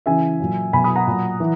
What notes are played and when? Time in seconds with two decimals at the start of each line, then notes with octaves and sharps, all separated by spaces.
0.06 C#3 E3 E5 G#5
0.40 A#2 F#3
0.73 B2 F#3 G#5 B5
0.84 B5 D#6
0.96 F#5 A#5
1.07 A#2 F#3
1.40 E3